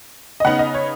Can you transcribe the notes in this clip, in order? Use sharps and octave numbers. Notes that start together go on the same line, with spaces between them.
D#5
C#3 B3 D#4 F#5
D#5
C#5